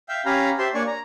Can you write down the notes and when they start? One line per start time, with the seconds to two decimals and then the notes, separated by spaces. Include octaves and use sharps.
0.09 E5 F5 G5 E6
0.26 C#4 G4 F5 G#5 A#5 B5
0.59 G4 C5 E5 A5 C6
0.74 A#3 D4 C#5 D5 G#5 C#6
0.87 A#5